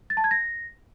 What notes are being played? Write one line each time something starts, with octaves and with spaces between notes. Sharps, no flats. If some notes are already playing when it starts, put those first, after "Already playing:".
A6
A5
G#6
A#6